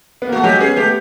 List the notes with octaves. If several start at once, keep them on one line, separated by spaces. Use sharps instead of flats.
B3
A#3
A3 F#4
F#3 G#3 G4
B3 C#4 G#4
A3 B3 G4